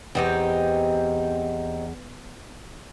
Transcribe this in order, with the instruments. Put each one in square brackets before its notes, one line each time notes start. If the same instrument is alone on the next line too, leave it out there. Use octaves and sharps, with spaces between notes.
[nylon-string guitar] E2 [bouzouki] C4 D#4 G4